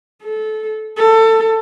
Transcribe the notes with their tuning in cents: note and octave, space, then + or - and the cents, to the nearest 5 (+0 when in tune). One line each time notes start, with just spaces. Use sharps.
A4 -20
A4 +20